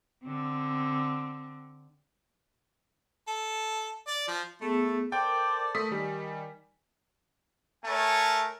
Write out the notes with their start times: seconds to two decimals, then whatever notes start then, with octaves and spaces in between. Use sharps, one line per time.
0.24 D3 C4
3.28 A4
4.07 D5
4.28 F3
4.61 A3 B3 G#4
5.12 A4 A#4 C5 D5 G5 C6
5.75 A3 D#6 B6
5.92 D#3 G3 G#5
7.85 A3 A#4 C#5 G#5 A5